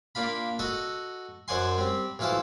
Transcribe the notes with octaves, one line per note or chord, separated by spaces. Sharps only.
A#3 D4 F4 B5
F#4 A4 D#5 F#5
F#2 C5 D5 F#5 G#5 C6
G3 C4
B1 E3 F4 A4 C5 A5